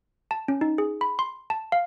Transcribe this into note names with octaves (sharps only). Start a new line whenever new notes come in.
A5
C#4
D#4
G#4
B5
C6
A5
F5